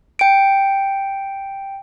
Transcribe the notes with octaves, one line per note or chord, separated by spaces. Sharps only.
G5 D7